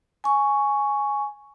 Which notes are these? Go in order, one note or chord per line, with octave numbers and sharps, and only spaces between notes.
G#5 C#6